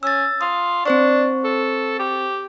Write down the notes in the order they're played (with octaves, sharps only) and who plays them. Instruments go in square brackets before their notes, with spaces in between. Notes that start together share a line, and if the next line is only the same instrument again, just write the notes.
[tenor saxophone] C#4 [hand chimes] E6 A6
[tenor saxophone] F4 [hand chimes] D#6
[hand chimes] C4 C5 C#6 [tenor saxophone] D4
[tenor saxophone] A4
G4